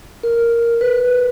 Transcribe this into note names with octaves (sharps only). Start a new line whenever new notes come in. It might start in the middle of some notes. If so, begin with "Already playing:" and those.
A#4
B4